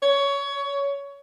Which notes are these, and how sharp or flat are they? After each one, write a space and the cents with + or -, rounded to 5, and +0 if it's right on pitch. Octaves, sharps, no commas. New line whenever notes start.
C#5 +20